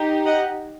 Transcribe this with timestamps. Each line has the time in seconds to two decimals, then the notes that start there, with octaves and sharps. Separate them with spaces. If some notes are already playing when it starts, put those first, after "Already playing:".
Already playing: D#4 G4
0.25 D#5 F#5